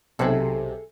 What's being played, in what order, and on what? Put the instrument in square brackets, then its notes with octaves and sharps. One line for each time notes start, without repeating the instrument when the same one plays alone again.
[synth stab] B1 C3 [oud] G#4 A4